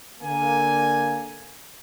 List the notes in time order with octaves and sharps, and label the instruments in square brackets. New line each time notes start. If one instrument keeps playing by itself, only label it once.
[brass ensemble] D3 A#3 G#5